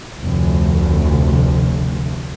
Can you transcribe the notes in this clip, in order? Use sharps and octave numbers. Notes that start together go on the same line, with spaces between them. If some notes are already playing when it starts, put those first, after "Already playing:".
F1 D2